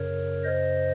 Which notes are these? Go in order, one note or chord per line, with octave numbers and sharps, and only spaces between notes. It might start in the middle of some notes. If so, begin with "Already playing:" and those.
Already playing: F#2 C#3 A#4 C#5
C5 D#5